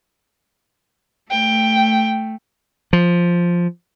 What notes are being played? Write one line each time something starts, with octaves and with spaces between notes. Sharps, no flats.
A3 G5
F3